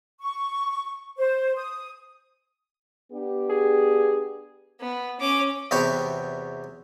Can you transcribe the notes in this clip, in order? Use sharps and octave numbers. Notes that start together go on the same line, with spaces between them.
C#6
C5
D#6
B3 D4 G4
G#4
B3
C#4 D6
E2 C3 B3 F#4 C#5 G5